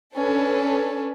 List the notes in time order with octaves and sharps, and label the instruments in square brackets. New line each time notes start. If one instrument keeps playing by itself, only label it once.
[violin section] C#4 D4 A4 B4